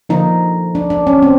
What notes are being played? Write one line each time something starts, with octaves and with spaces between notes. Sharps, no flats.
D3 F3 A#3 D#4
D4
D4
C#4
C4